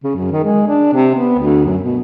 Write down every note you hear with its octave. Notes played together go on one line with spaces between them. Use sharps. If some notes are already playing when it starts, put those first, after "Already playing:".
C#3
F#2
D#3
G#3
D4
C3
B3
D2
F#2
B2